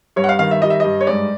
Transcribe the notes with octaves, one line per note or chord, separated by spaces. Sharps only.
G2 C#5
F#5
F5
D#3 F5
E5
G3 D#5
E5
G2 D#5
C#5
G#2 D5